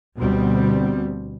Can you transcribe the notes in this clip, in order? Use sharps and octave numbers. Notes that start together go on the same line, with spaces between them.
D2 B2 G3 C4